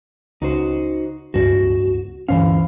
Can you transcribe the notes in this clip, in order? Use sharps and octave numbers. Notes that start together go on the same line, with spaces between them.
C#2 D#4 F#4 C5
D1 C#2 G2 F#4
D2 G2 E3 C#4 C5 F5